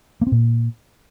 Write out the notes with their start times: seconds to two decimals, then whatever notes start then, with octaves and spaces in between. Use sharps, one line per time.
0.21 A#3
0.27 C4
0.32 A#2